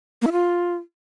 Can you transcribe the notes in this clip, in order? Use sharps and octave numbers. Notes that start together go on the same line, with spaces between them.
A#3
E4
F4